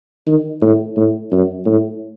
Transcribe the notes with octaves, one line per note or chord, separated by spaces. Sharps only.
D#3
A2
A2
F#2
A2